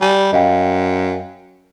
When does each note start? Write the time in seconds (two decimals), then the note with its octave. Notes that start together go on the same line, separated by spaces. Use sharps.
0.02 G3 G#5
0.33 F#2 D#5 F5 G5